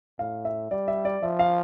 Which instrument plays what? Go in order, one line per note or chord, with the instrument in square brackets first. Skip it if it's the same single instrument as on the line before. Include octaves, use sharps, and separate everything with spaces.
[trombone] A2 [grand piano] F5
[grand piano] E5
[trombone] G3 [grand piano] D5
[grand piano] E5
D5
[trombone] F3 [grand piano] E5
[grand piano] F5